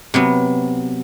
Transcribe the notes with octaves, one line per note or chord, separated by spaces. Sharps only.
C3 F#3 B3